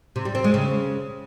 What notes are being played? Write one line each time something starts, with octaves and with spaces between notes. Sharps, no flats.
C3
G3
C4
G#3
C#3